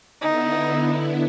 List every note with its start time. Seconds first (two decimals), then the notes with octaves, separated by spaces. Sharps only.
0.22 D3 B3 D#4 E4